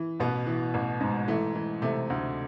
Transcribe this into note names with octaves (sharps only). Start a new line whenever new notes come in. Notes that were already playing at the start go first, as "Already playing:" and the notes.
Already playing: E3
A1 B2 B3
E3
A1
G#2
E3 A3
E3
C3 A3
D2